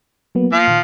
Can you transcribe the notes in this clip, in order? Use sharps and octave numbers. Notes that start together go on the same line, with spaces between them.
F#3 A#3 B3
F3 A#3 F5
A#2 D#3